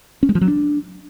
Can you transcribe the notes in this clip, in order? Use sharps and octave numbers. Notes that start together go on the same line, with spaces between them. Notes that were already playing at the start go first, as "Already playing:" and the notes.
C#4
G#3
F3
F#3
D4